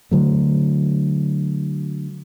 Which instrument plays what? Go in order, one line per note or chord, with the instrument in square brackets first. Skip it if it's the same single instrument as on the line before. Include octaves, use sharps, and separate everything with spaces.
[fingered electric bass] D3 F#3 A3